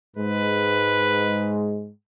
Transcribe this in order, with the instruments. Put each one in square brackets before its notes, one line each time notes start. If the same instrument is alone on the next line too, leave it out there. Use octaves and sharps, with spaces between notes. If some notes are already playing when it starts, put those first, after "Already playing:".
[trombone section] G#2 G#3 [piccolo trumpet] B4